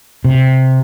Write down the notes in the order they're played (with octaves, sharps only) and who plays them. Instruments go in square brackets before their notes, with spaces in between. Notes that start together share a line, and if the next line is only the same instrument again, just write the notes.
[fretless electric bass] C3